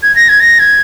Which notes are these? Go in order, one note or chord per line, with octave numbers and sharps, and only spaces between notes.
G#6
A#6
G#6
A#6
G#6